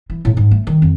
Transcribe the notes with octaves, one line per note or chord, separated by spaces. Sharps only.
E3
A2
G#2
A3
D#3
F2